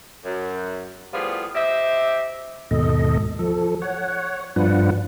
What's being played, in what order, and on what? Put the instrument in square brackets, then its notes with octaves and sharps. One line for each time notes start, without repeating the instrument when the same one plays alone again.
[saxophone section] F#2
A2 F3 G3 B3 F4 G#4
G4 C5 D#5 E5
[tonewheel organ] D#2 G#2 B2 A4 D#5
F3 A4
C#5 F#5
G2 F3 D4 F4 B4 F#5